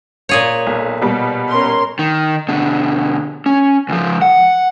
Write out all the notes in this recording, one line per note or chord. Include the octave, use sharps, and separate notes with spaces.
A#2 G#4 C#5
B1
B2 G3
C#4 A#4 C6
D#3
B2 D3
C#4
C#2 F3
F#5